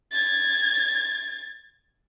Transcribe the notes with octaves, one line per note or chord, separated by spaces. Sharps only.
G#6 A6